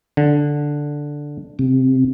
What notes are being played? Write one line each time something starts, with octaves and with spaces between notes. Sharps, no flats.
D3
C3